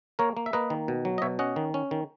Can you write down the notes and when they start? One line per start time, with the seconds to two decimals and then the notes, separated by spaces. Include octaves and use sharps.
0.19 A#3 A#4 C#5
0.37 A#3
0.46 E5
0.53 A#3 B4 D#5
0.70 D#3
0.88 B2
1.05 F#3
1.18 D#5
1.22 B2 C#5 E5
1.39 C#4 D#5 F#5
1.56 D#3
1.74 C#4
1.91 D#3